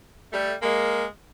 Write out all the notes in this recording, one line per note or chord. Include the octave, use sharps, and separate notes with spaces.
G3 A3
G#3 A#3